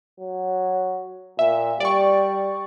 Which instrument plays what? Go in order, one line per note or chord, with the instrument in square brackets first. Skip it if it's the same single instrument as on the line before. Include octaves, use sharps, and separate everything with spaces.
[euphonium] F#3
[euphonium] A#2 [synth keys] E5
[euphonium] G3 [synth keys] D5 C#6